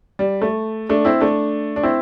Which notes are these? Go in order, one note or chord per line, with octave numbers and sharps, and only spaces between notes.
G3
A3
A3 D4
C4 E4
A3 D4
D4
C4 E4